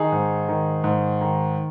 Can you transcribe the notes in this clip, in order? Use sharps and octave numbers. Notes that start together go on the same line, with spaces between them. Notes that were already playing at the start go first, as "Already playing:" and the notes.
Already playing: D#3 D#4 G#4
G#2
D#3
G#2
D#3